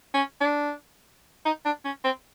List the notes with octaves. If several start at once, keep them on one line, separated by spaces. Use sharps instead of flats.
C#4
D4
D#4
D4
C#4
C4